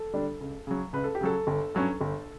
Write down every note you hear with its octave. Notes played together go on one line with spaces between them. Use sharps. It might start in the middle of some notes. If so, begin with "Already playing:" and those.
Already playing: A4
D3 G3 D4
C#2
C#3 F#3
C#2 B4
A4
G4
C#3 F#3 A4
G1
G2 F#3 C#4
G1